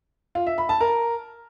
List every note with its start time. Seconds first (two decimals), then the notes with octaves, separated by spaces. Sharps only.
0.35 F4
0.47 E5
0.58 B5
0.69 A5
0.81 A#4